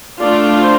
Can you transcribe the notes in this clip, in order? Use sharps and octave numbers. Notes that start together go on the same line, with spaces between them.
A3 D4 F4 D5
C5